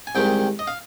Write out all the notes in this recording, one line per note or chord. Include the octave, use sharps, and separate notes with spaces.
G#5
C2 C3 D#3 G#3 G5
D#5
F5